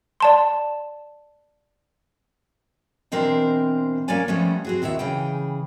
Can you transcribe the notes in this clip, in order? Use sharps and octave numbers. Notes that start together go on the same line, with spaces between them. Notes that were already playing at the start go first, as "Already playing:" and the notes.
D5 A5 C6
B2 E3 C4 D4 A#4 C5
A#3 C#4 C#5 D5 G#5
F3 G3 A3 B3 C#4
C4 F#4 G#4
D#2 B2 E4 G4 E5
C#3 E3 G#4 G5